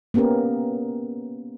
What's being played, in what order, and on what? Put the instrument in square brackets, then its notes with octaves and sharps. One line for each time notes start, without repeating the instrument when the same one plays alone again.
[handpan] A#3 B3 C#4 G4 A#4